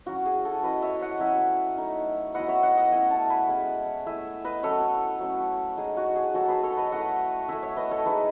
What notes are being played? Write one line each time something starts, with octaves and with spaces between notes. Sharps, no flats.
F#3 C#4 E4 F#4
G#4
F#4 A4
F#3 C#4 E4 B4 D#5
C#5 E5
D#5 F#5
F#3 C#4 E4 E5 G#5
A3 D#4
F#3 B3 E4 D#5 F#5
C#5 E5
D#5 F#5
D#5 F#5
A3 C#4 E4 E5 G#5
F#5 A5
G#5 B5
G#3 C#4 E4
A3 E4 E5 G#5
B4 D#5
F#3 C#4 E4 A4 C#5
F#3 A3 C#4
G#3 D#4 G#4
F#4
G#4
F#3 A3 D#4 F#4 A4
G#4 B4
A4 C#5
B4 D#5
A3 E4 D#5 F#5
A3 E4 E5 G#5
C#5 E5
B4 D#5
A4 C#5
G#3 D#4 G#4 B4